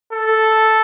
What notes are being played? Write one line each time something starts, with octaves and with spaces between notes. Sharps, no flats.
A4